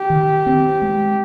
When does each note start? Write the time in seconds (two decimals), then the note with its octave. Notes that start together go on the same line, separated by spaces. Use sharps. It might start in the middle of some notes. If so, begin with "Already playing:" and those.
Already playing: G4
0.10 D#3
0.47 C4
0.82 G#3